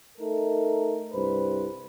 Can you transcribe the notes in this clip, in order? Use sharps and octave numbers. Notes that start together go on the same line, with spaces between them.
A3 D#4 A4 A#4
C2 G2 B4 C5